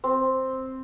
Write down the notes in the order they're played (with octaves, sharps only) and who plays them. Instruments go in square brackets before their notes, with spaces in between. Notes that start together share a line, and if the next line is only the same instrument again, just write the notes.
[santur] C4